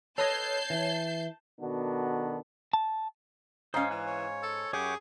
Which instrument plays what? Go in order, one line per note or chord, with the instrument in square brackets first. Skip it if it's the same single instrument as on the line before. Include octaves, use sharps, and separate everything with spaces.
[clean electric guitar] A4 B4 D#5 [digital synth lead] C#5 [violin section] A5 G6 C7
[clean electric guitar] E3
[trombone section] B2 D#3 B3 D4 F#4 A4
[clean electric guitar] A5
[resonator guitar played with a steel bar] G#2 C#4 [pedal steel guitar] C5 F5 [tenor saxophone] D#5
[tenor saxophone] E3 [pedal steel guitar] F5 G#5 F#6
[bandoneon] C#5
[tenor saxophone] A4
[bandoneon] F#2 G4 D6 [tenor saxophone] G#4 [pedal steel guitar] C#5 F#5 G6